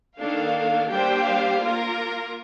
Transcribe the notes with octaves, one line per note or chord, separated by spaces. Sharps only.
D#3 A#3 D4 A4 F5
G3 A#3 D4 G4 C5 G5
F5
A#3 F4 A#4